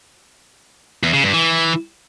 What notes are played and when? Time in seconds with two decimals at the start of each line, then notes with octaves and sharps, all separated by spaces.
1.03 E2
1.13 C#3
1.23 G2
1.33 E3